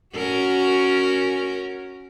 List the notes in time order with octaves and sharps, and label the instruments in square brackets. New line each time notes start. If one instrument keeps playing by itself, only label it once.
[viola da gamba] C#4 F#4 A#4